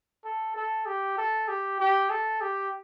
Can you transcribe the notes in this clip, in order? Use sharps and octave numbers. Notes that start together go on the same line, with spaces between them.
A4
A4
G4
A4
G4
G4
A4
G4